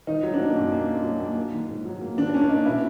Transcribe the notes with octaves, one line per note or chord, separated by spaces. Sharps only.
D#3 D#4
F#3
D4
A#3 D#4
F#2
A#3
A#3
F#3
A#3
A#3
D#3
G#2
F#3
A#3
D#3 D4
D4
A#3 C#4
D4
A#3 D#4
B2 E4